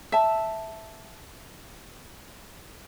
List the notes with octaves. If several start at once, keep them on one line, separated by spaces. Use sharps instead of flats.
E5 A5